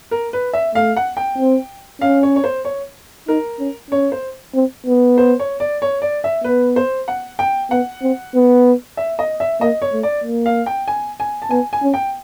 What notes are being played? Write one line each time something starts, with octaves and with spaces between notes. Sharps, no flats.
A#4
B4
E5
A3 F5
F#5
G5
C4
C#4 F5
C#5
C#5
C5
C#5
D#4 A#4
C#4
C#4 C#5
C5
C4
B3
C5
C#5
D5
C#5
D5
E5
B3 B4
C5
F#5
G5
B3 F#5
C4
B3
E5
D#5
E5
A#3 D#5
C#5
A3
D5
A#3
F5
G5
G#5
G#5
A5
B3 G#5
G#5
C#4
G5